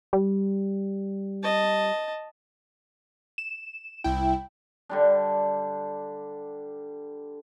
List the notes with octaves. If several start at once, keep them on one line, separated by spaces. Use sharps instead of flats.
G3
D#5 A5
E7
C2 E4 G5
D3 G3 D4